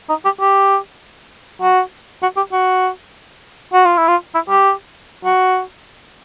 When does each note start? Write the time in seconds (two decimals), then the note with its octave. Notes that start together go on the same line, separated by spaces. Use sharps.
0.09 D#4
0.25 G4
0.40 G4
1.62 F#4
2.22 F#4
2.37 G4
2.52 F#4
3.73 F#4
3.85 F4
3.97 E4
4.08 F4
4.35 E4
4.49 G4
5.25 F#4